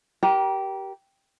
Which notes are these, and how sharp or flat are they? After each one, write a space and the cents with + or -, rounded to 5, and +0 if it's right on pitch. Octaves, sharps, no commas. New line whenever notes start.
G4 -15 A#4 +25 A#5 +35